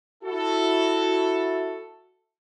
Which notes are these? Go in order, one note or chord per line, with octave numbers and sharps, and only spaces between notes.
E4 F#4 A4